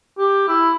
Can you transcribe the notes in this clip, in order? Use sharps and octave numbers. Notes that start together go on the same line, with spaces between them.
G4
E4